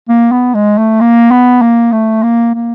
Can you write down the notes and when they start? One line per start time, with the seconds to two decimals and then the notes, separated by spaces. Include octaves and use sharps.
0.09 A#3
0.32 B3
0.55 G#3
0.78 A3
1.01 A#3
1.31 B3
1.62 A#3
1.92 A3
2.23 A#3
2.54 A#3